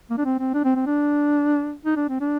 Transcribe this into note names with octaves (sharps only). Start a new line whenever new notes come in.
A#3
D4
C4
C4
D4
C4
C4
D4
D#4
D4
C4
D4